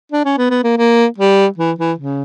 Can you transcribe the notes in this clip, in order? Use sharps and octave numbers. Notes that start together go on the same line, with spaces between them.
D4
C#4
B3
B3
A#3
A#3
G3
E3
E3
C#3